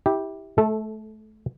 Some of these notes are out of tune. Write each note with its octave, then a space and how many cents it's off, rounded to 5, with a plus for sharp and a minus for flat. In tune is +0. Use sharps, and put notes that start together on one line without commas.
E4 -25 G4 +0
A3 -25 A4 +0